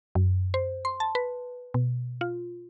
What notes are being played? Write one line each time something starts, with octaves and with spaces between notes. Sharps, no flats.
F#2
C5
C6
A5
B4
B2
F4